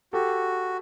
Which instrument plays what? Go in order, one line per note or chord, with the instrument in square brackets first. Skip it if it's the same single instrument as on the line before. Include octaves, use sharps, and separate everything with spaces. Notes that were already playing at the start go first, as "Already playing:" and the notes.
[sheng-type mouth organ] F#4 [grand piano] G4 A4